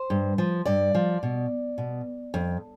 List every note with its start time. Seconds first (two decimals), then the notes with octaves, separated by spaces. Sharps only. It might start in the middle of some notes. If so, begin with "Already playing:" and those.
Already playing: C5
0.10 G2
0.38 F3
0.65 G2 D5
0.95 F3
1.23 B2
1.78 B2
2.34 F2